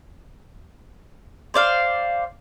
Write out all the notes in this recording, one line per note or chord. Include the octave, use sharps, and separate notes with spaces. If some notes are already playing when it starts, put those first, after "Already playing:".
C5 D5 F5